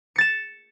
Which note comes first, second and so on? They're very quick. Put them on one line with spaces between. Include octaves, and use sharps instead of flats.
C#7 A6 E7